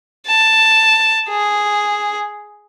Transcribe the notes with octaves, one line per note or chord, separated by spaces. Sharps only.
A5
G#4